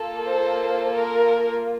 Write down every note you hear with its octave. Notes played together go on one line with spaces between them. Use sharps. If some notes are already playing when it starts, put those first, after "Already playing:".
Already playing: A#3 F4 A4
C5
A#4